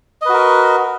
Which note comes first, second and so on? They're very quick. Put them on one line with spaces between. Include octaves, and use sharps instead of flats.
D#5 B4 F#4 A#4